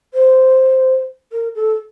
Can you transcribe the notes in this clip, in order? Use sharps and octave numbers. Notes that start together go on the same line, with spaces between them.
C5
A#4
A4